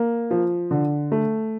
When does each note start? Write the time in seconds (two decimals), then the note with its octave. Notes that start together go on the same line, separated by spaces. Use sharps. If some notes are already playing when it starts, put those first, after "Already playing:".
Already playing: A#3
0.31 F3
0.71 D3
1.12 A3